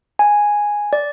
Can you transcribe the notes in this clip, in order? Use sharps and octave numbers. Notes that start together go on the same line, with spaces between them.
G#5
D5